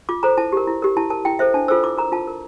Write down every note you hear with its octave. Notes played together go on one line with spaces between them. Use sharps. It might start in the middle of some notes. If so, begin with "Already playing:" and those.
F4 D6
A4 C5 A#5
E4 A5
G4 A#4
E4
G4 A#4
E4 A5
A#4 A5
E4 G5
A4 C5 E5
D4 A5
F4 A4 C5 E6
E4 D6
A#4 A#5
F4 A5
A#4